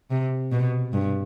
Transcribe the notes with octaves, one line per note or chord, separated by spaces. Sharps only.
C3
B2
G2